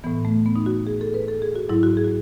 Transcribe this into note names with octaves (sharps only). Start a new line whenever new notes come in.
A2 E3 B3
A3
B3
D#4
F#4
G#4
A4
B4
A4
G#4
F#4
G#2 F#3 E4
F#4
G#4
F#4